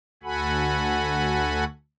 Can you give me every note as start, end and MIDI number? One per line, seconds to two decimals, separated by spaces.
0.23 1.64 38
0.23 1.64 66
0.23 1.64 69
0.23 1.64 78
0.23 1.64 80
0.23 1.64 83